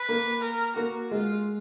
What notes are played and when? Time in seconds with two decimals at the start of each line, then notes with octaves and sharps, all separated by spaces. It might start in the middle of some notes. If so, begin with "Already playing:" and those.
Already playing: B4
0.09 A#3
0.42 A#4
0.76 A#3 F#4
1.11 G#3 F4